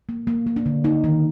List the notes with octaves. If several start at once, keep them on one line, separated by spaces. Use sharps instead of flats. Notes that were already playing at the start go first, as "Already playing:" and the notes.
A#3
A#3
A#3
D4
D3
A#3 D#4
D#3